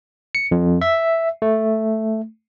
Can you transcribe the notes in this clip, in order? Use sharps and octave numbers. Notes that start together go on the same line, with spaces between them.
C#7
F2
E5
A3